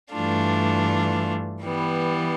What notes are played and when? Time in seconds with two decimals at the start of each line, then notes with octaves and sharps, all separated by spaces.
0.12 G2 E3 A3 D4 F4
1.62 E3 G3 B3